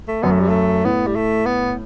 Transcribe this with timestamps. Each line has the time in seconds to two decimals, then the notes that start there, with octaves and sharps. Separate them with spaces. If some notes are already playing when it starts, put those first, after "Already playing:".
0.08 A3
0.22 F#2 B3
0.31 A3
0.40 G3
0.49 A3
0.85 A2 B3
1.07 G3
1.16 A3
1.46 B3